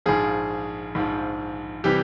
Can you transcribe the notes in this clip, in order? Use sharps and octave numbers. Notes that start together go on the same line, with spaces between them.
A#1 G#2 F3 G#4
A#1 G#2 F3
C3 E3 G3 G4